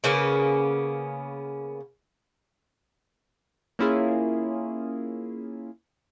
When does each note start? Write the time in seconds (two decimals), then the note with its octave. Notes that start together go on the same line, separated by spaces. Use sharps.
0.04 C#3 A#3 B3 C#4
3.79 A#3 C#4 E4 F4 G#4